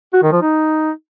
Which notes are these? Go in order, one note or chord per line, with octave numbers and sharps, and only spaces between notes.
F#4
D#3
F3
D#4